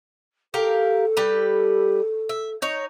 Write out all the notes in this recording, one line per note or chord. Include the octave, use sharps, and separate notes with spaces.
G4 A4 A#4 F5
G3 G4 B4
E5
D#4 C#5